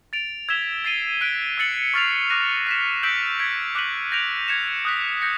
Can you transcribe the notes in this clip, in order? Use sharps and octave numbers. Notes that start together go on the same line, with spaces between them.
A6 D7 F7
E6 G#6 B6 E7 G7
A6 C7 D#7 G7
F#6 B6 D7 G7
E6 A6 C#7 F#7
C#6 F6 A6 C7 F7
D6 F#6 A#6 D#7
F#6 B6 E7
E6 G6 B6 D7 F#7
G#6 B6 D7
D6 F#6 B6 D#7 F#7
G6 A#6 D7 F7
G#6 C#7 E7
D#6 F#6 B6
G6 A#6 C#7